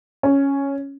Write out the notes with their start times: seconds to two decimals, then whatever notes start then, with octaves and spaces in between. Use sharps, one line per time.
0.23 C#4